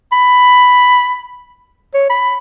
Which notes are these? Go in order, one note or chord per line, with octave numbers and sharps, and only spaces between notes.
B5
C#5
B5